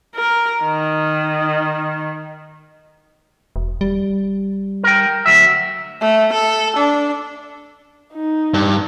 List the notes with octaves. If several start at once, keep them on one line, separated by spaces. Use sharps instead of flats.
A#4
D#3
E1
G3
A#4 G5
D2 F#3 E5
A3
A4
D4
D#4
G2